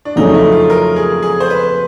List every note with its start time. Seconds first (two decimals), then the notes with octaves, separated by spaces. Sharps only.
0.05 D4
0.16 F2 C#3 F#3 A3 C#4 D#4
0.34 E4
0.52 F4
0.70 A#4
0.96 G#4
1.23 G#4
1.40 C5
1.50 B4